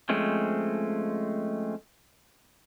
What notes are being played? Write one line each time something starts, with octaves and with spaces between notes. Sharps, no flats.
F3 G#3 A3 C4 C#4